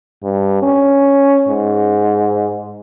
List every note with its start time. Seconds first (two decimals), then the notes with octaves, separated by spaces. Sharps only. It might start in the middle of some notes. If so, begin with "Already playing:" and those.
0.23 G2
0.62 C#4
1.48 G#2